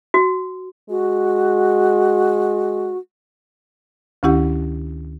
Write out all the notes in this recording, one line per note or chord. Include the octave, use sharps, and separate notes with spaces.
F#4
G#3 F#4
D2 D#3 C#4 E4 G4 F#5